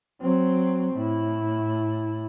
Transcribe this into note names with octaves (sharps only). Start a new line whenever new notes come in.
F#3 C4
A2 E4